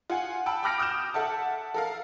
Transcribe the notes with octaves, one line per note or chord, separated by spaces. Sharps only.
F4 F#5 G#5
G5 A5 B5 E6
G5 B5 D6 F6 A#6 D7
D6 D#6 F6 G6 E7
A4 E5 F#5 A5
A4 A#4 F5